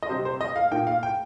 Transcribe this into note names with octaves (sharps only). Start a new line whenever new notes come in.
D#5
C3 G3 C4 C5
C5
D#5
F5
A#2 A#3 D#4 G5
F5
G5